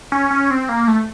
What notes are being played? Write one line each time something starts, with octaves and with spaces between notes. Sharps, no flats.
C#4
C#4
C4
A#3
A3